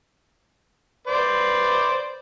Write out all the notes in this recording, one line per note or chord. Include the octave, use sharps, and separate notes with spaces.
B4 C5 D5